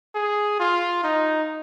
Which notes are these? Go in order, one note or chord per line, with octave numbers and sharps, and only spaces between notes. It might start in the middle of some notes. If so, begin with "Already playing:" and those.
G#4
F4
D#4